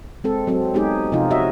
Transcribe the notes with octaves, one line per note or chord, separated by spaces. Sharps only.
G#3 C4 A4
F#3 C4 A4
G#3 B3 D#4 G4 G#4
C3 F3 D#4 F4
F#4 C#5 D#5 E5